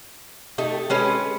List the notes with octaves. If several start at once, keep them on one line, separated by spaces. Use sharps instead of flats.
A3 D#4 G4 A4
G#3 C#4 B4